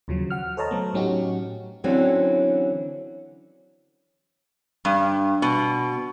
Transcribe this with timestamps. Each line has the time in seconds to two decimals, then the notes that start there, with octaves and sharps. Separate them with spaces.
0.08 D#2 C#3 F3 F#3
0.30 F#5 F6
0.57 A4 C5 C#5 D#5 A5 A#5
0.71 F#3 A3 B3
0.94 A2 F#3 C#4 D#4 F#4 G4
1.84 D3 E3 F#3 C4 C#4 A4
4.85 G2
5.42 B2